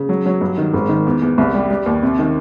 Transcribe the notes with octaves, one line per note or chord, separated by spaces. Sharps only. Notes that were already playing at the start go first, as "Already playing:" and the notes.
Already playing: C#3
F#3
F#3
G2
D#3
G#1
D#3
E2
E2
C2
G3
G3
D#2
C3
D#3